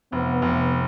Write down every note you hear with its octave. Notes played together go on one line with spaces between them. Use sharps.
F1 B3
F1